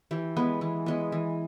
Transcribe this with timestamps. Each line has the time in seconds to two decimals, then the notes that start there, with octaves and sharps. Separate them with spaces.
0.11 E3 G4
0.37 G#3 B3
0.61 E3
0.86 G#3 B3
1.12 E3